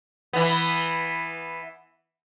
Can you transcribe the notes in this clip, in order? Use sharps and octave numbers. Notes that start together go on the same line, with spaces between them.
E3 B3